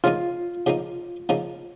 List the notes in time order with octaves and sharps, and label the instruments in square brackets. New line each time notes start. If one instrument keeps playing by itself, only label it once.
[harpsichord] C#3 F3 A#3 D#4 [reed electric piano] F4
[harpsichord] C#3 F3 A#3 D#4
C#3 F3 A#3 D#4